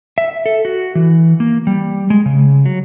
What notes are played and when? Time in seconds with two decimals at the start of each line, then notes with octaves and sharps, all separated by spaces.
0.18 E5
0.46 A4
0.65 F#4
0.95 E3
1.40 A#3
1.67 G3
2.10 G#3
2.26 C#3
2.66 F#3